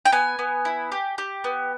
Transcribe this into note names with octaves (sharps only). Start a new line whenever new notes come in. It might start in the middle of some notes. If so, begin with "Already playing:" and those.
G5
B3 G#5
B3
E4
G4
G4
B3